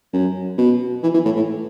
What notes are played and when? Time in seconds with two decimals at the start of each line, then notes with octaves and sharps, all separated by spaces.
0.13 F#2
0.58 B2
1.03 E3
1.14 E3
1.25 A2
1.36 A2